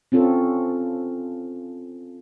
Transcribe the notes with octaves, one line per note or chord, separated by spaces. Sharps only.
C4 C#4 F4 A4